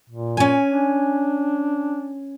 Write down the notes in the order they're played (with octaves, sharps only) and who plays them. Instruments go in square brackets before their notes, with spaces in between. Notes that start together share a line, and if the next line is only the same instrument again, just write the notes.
[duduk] A#2
[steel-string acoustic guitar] C#4 G#5
[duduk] D4